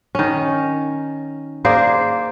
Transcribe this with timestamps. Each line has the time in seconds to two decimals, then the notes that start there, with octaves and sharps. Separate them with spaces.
0.15 D#3 C#4
1.65 A#3 G#4 C5 D5